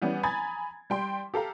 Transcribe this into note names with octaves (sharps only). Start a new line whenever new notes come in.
E3 G3 B3 C#4
G#5 A#5 B5 D#6 G#6 A6
G3 G5 C6
G4 A4 F5 A#5